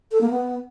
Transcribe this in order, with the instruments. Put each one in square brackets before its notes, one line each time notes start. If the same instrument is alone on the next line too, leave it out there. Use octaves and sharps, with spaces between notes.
[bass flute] A4
A#3
B3